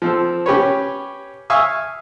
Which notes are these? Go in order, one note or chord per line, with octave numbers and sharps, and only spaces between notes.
F3 C4 A4
C#4 G4 B4 C#5
E5 F5 G#5 C#6 D#6 E6